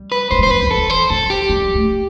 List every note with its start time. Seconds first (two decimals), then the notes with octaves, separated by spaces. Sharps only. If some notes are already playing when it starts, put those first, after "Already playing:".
Already playing: G3
0.12 B4
0.31 F#3 C5
0.39 G3
0.43 C5
0.46 F#3
0.51 G3 B4
0.63 F#3
0.71 E3 A4
0.90 C5
1.10 F#3 A4
1.30 G4
1.49 G3
1.75 A3